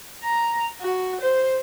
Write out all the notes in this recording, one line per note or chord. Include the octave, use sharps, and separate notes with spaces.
A#5
F#4
C5